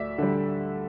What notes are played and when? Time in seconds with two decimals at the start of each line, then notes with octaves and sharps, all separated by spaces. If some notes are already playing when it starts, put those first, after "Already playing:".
Already playing: D2 D5 E5
0.18 D3 G3